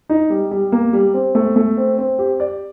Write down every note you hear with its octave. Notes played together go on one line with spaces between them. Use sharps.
D#4
G3
G3
A#3
G3
C4
A3
A3
C4
C4
G4
D5